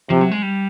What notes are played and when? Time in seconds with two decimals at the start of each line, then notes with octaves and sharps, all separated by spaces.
0.10 C3 F3
0.21 F#3
0.31 G#3
0.42 G3